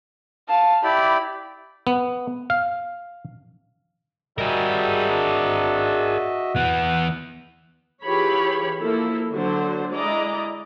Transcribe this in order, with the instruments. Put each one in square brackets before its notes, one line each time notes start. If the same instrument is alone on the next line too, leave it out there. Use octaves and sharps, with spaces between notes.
[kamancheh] F5 A5
[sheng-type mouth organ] E4 G4 D5 [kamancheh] B5
[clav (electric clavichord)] B3
F5
[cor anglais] G3 [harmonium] F#4 D#5 E5 [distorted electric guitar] G#4 A#4
[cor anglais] D4
[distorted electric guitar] E3 B3 [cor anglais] F#5
[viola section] E3 F4 G4 G#4 C#5 B5
F3 A#3 E4 A4
D3 F#3 C5
G#3 E4 D5 D#5 A#5